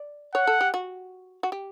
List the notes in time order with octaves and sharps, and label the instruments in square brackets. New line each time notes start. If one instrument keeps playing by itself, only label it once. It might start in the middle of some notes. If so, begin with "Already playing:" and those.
Already playing: [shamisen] D5
[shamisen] C#5 [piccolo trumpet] F#5
[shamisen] A4
G4
F#4
F#4
G4